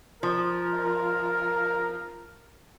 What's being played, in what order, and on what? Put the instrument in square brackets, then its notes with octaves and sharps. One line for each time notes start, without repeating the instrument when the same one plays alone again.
[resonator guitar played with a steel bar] F3 [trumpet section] A#4